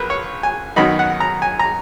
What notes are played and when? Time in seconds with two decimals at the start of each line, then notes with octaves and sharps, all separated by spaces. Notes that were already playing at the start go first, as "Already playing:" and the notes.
Already playing: A#1 A#4 B4
0.10 C#5
0.43 G#5
0.76 F#2 D#3 F#3 B3 D#4 B5
0.99 F#5
1.20 A#5
1.42 G#5
1.59 A#5